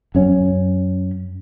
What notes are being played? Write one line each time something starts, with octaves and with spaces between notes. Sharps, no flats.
F#2 C#4